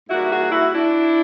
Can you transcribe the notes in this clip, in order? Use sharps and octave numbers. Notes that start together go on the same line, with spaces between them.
G#2 E3 G3 A#3 E4 F#4
F#4 G#4
E4 F#4
D4 E4